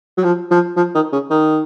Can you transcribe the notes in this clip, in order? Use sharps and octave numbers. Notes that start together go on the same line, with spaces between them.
F#3
F3
F3
F3
D#3
C#3
D#3